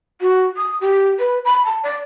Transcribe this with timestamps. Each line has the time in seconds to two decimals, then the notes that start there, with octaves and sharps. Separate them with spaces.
0.20 F#4
0.56 D#6
0.80 G4
1.18 B4
1.44 B5
1.64 A5
1.83 D5